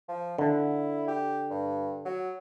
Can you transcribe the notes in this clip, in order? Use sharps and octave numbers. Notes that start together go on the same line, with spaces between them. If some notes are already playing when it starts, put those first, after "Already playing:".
F3
D3 E4
G4
G2
F#3